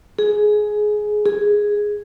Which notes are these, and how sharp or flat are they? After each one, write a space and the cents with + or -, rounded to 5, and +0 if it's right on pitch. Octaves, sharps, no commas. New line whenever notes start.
G#4 +15
G#4 -5